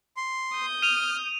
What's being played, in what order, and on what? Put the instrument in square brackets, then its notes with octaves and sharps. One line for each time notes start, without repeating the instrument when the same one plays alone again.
[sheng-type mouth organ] C6
[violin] D#6 G6
[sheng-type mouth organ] F6 [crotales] D#7 F7